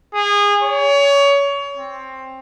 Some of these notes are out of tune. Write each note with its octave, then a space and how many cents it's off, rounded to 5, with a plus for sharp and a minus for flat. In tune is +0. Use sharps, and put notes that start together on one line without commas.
G#4 -25
C#5 +25
C4 +15